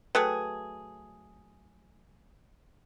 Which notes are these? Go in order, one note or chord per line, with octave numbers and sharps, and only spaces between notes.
F#3 A3 G#4 B4 G5 F#6